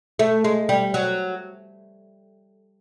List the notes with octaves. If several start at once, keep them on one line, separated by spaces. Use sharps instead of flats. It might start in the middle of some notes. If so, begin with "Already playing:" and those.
A3
G#3
G3
F#3